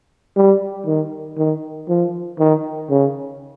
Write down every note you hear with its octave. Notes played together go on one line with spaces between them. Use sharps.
G3
D#3
D#3
F3
D#3
C#3